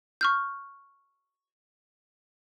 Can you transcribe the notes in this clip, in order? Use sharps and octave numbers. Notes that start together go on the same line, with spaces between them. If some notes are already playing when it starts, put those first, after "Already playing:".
C#6 F6 G6